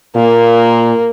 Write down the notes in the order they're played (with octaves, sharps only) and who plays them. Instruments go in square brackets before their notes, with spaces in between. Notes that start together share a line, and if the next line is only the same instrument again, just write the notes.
[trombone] A#2 [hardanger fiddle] A#3